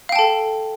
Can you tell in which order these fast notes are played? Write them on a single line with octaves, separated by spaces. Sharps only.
F5 G5 A5 A4